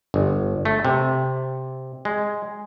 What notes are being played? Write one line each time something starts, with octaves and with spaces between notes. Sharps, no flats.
G1
A3
C3
G#3